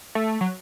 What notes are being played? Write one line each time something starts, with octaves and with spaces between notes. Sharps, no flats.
A3
F#3